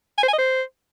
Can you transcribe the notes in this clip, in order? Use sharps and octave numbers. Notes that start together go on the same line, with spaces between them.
G#5
C5
G#5
D#5
C5